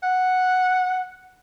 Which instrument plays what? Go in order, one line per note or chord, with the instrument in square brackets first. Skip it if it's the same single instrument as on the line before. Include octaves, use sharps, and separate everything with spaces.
[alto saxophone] F#5